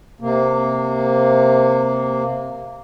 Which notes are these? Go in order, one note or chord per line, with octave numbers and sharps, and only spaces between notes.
C3 A#3